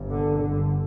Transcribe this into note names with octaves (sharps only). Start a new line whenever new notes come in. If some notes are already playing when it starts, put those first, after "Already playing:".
Already playing: G1 G2
D3
G1 G2 D3